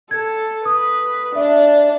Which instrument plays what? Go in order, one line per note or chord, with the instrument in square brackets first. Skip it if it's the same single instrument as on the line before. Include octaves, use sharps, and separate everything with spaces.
[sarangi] A4 [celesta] G#6
[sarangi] B4 [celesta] D#6
[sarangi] D4 [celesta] E5